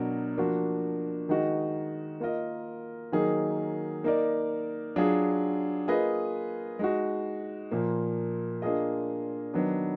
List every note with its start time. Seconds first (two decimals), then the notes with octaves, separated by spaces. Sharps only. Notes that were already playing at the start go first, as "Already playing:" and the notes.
Already playing: B2 F#3 D4 F#4 A#4
0.38 F3 A#3 D4 F#4
1.29 D#3 G#3 D#4 F#4
2.20 A#3 F4 A#4 D#5
3.12 D#3 F#3 A#3 D#4 G#4
4.04 A#3 D#4 A#4 D5
4.96 F#3 D4 F4 G#4
5.88 A#3 F4 G#4 B4 D#5
6.79 G#3 D#4 F#4
7.71 A#2 F3 A#3
8.62 A#3 D4 F4 G#4 D#5
9.54 D#3 F#3 B3 D4